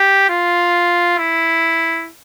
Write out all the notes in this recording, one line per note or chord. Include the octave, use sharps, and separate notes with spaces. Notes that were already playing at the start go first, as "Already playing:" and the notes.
Already playing: G4
F4
E4